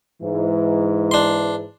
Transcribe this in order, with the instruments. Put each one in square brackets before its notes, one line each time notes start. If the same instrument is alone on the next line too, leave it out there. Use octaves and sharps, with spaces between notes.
[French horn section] G#2 E3
[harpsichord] D4 C6